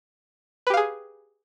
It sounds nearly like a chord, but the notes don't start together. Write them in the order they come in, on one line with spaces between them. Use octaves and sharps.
B4 G4 F5 G#4